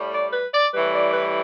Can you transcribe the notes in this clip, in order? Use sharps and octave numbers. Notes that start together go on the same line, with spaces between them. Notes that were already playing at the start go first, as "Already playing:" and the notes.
Already playing: A2 G3
D5
B4
D5
A2 E3 G3 B4
D5
B4